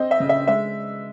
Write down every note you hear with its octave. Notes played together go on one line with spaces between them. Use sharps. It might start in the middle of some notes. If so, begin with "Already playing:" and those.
Already playing: C4 D#5
E5
C#3
E5
G#3 E5